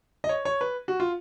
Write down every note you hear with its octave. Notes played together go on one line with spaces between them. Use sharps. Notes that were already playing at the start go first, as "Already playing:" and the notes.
D#5
C#5
C#5
B4
F#4
F4